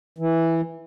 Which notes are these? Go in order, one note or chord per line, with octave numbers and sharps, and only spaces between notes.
E3